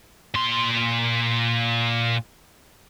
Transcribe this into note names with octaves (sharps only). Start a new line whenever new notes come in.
A#2 C6